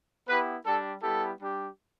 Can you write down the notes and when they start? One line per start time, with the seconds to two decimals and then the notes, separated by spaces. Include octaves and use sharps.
0.27 B3 E4 G4 B4
0.65 G3 D4 G4 A4
1.02 G3 B3 E4 G4 A4
1.39 G3 D4 G4